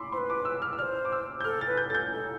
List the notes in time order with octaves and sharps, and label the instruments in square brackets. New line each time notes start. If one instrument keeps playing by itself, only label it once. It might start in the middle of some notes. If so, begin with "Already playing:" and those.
Already playing: [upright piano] B5 C6 D6 E6
[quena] C5 [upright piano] C6
[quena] B4
[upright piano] D6
E6
F6
E6
[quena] C5 D5 [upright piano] F6
[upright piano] D6
E6
G6
[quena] A4 [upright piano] F6
[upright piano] A6
[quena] B4
[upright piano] G6
[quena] A4 [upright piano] A6
[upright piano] G6
[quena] A4